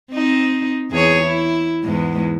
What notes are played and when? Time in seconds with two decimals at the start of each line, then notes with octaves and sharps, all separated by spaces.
0.13 C4 D#4
0.91 E2 G#4 C#5
1.22 E4
1.83 E2 G#2